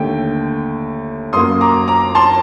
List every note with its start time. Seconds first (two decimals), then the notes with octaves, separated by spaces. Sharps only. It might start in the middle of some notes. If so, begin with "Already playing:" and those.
Already playing: D#2 D3 A3 G5
1.33 F#2 F#3 A#3 C6 D#6
1.61 A#5 D6
1.88 A#5 D6
2.15 A5 C6